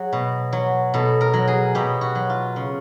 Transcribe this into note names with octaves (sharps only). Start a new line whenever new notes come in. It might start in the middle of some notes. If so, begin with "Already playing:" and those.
Already playing: F#3 G#4
B2
F#3
B2 A4
A#4
F#3
G#4
B2 G4
F#4
F#3
F4
C#3